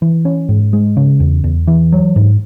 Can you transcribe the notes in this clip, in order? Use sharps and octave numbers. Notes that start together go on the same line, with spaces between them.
E3
C#4
G#2
G#3
C#3
E2
E2
E3
F#3
G#2